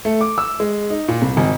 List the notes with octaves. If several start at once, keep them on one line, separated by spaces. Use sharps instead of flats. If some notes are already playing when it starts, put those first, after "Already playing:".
A3
D6
E6
G#3
D#4
A#2
C2
G#1